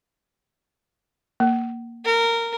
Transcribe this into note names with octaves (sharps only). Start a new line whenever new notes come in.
A#3
A#4